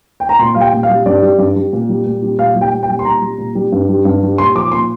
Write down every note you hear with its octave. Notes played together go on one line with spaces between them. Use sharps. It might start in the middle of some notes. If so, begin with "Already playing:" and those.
G5
A#5
A#2 C6
G3 F5
G5
A#2
F5
G3
G2 D5
G3
G2
G3
A#2
G3
A#2
G3
A#2 F5
G3
G5
A#2
G5
G3
C6
A#2 A#5
G3
A#2
G3
G2
G3
G2
G3
A#2 C6
F3 D6
A#2 C6